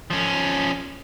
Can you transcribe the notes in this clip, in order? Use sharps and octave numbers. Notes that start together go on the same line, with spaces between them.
F3 C#4